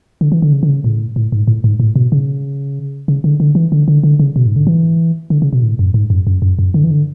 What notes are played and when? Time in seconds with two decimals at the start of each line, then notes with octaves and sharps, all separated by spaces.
0.21 D3
0.32 E3
0.42 D3
0.52 C#3
0.63 D3
0.69 C#3
0.84 A2
1.16 A2
1.32 G#2
1.48 A2
1.64 G#2
1.80 A2
1.96 B2
2.12 C#3
3.08 C#3
3.24 D3
3.40 D3
3.55 E3
3.72 D3
3.88 D3
4.04 D3
4.20 C#3
4.36 B2
4.46 G#2
4.56 D3
4.67 E3
5.30 D3
5.42 C#3
5.53 B2
5.63 A2
5.79 F#2
5.94 G#2
6.10 F#2
6.27 F#2
6.42 F#2
6.59 F#2
6.74 D3
6.84 E3
6.91 D3